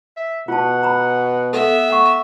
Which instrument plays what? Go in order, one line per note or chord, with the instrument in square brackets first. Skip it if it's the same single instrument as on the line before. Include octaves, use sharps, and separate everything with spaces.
[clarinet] E5
[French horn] B2 [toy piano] F4 A5 [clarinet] F#5
[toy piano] A#5 B5
[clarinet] B3 [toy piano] A4 [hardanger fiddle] E5
[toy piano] F#5 C#6